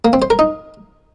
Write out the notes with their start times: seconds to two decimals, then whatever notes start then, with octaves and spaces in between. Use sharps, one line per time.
0.05 A#3
0.13 C4
0.22 C5
0.30 A#4
0.39 D#4